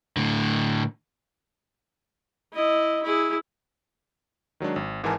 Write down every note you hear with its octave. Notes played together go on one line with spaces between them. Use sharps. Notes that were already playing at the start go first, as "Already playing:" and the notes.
A2 D3
E4 D#5
E4 G#4
D#3 F#3 G#3 D4
G#1
G#1 G#2 E3 A#4 G#5 A5